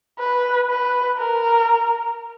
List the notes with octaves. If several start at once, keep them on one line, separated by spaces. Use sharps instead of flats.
B4
B4
A#4